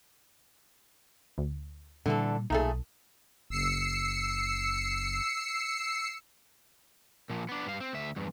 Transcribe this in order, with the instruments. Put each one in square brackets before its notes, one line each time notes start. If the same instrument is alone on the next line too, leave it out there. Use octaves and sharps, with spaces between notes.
[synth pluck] D2
[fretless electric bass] A#2 G3 [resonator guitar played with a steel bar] D3 E3 A4
[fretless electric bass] B1 [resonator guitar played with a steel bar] A#2 A3 G#4 [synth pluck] D#4 A4
[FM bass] F#1 [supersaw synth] E6 C7 C#7
[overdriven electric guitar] A#2 F3
B3 D4
G2 F5
C4
D2 E5
E2 G2